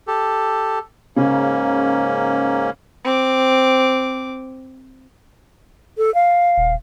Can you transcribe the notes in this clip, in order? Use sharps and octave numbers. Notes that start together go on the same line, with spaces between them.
G4 A4
G#2 C#3 A#3 C#4
C4 D6
A4
F5
D#1